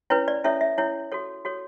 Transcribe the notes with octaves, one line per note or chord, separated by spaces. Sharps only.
C#4 E4 B4 C#5
D5
C#4 E4 A4 C#5 E5
E5
C#4 E4 A4 C#5
F#4 A4 C#5
F#4 A4 C#5